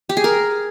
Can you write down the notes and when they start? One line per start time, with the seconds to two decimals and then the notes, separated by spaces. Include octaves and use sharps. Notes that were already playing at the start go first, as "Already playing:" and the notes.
0.09 G4
0.17 G#4
0.24 A#4